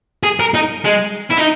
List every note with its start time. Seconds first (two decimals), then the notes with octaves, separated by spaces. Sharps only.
0.23 G#4
0.40 A#4
0.54 D#4
0.85 G#3
1.30 E4
1.37 D#4